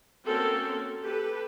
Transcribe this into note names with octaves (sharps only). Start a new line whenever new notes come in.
A#3 C4 C#4 F#4 A4 A#4
G4 A4 B4